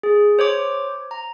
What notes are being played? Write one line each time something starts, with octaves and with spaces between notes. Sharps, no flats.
G#4
C5 C#5 D6
A#5